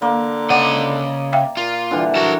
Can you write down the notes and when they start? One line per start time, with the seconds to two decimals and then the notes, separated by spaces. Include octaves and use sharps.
0.02 D3 A#3
0.50 C#3 D5 D#5 F#5
1.33 E5 F5 G5
1.57 A#2 F4
1.91 D3 E3 G3
2.15 F#3 A#4 A5